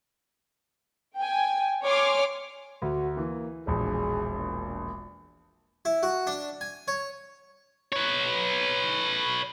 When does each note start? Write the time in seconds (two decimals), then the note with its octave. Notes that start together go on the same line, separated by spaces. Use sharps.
1.17 G5 G#5
1.85 C#5 G#5 C6 D6 F6
2.82 D2 F#4
3.17 E3 A#3
3.67 E1 A#1 G#4
4.37 A#2
5.85 E4
6.03 F#4
6.27 D4
6.61 G#5
6.88 C#5
7.92 B4 C#5